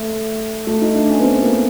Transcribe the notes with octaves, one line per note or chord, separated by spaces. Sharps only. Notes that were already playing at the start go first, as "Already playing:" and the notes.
Already playing: A3
A3
D#4
D4
C#4
B3
C4
A#3